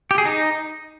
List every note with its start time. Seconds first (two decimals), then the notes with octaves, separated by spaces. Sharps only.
0.11 G4
0.18 G#4
0.25 D#4